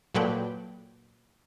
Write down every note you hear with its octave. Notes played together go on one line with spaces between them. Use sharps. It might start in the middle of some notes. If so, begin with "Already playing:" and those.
A#2 F#3 A4 B4 D5 G5